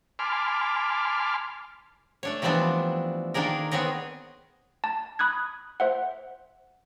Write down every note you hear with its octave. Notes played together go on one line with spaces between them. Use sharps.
G#5 A5 B5 C6 D6 F6
A3 D4 C#5
E3 F3 G3 B3 C4 D4
D#3 A#3 D4 G#4 A#4
B3 C4 G#4 C#5 D#5
A5
B5 D#6 F#6 G#6
C5 E5 F#5